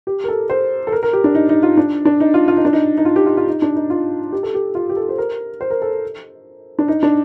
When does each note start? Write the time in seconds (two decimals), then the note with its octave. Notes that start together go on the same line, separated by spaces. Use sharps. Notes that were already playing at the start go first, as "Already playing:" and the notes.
0.07 G4
0.24 A#4
0.28 A4
0.50 C5
0.87 A4
0.92 A#4
1.03 A#4
1.13 G4
1.24 D4
1.35 D#4
1.49 D#4
1.63 F4
1.77 D4
2.05 D4
2.20 D#4
2.34 F4
2.48 F4
2.57 D#4
2.65 D4
2.73 D#4
2.97 D#4
3.05 F4
3.16 G4
3.26 F4
3.37 F4
3.48 D#4
3.62 D4
3.76 D#4
3.90 F4
4.32 G4
4.43 A4
4.54 G4
4.75 F4
4.89 G4
4.97 A4
5.09 C5
5.18 A#4
5.61 C5
5.70 A#4
5.82 A4
6.79 D4
6.88 D#4
7.03 D4